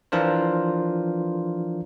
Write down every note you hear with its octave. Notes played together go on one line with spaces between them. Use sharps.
E3 F3 D4 F4 A#4 C5